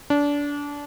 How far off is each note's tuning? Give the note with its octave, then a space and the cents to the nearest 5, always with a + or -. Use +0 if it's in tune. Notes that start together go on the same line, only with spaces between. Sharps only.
D4 -25